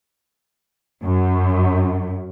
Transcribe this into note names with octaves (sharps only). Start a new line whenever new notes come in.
F#2